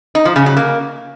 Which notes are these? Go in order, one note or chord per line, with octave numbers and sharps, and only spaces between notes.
D#4
F3
C#3
F#3
A#3